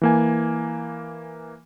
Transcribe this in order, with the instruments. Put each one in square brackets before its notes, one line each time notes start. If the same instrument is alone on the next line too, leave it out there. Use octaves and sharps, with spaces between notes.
[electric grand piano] E3 A#3 G#5